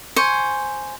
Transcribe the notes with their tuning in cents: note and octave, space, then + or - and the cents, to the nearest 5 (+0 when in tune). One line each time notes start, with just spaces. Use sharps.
C5 +0 G#5 +0 C#6 +0